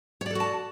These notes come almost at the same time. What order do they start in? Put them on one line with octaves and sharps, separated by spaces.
C#5 D5 A4 F#4 A5